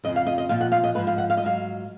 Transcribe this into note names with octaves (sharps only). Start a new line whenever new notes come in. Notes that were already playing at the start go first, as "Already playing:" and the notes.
F2 C#3 F3 D#5
F5
D#5
D#5
A#2 F3 F5
F#5
F5
D#5
G#2 F3 B4
F5
F#5
F5
D#5
G#2 F#3 F5